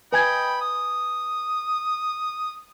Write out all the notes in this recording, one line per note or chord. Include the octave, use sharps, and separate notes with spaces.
B4 D#5 G5 G#5 B5 G#6
D#6